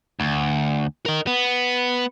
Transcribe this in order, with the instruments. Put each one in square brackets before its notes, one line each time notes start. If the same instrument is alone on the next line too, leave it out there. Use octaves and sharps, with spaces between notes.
[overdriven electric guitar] D2
A#4 D#5
B3